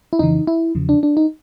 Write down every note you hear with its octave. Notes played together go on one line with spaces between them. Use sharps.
E4
F2 C#3 E3 D#4
E4
E2 C#3 F3
D4
D4
D#4